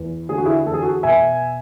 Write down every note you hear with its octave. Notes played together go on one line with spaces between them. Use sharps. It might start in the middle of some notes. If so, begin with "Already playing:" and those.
Already playing: E2
D3 G#4
F#4
E4 G#4
E2 A4
G#4
F#4 A4
B2 E5 G#5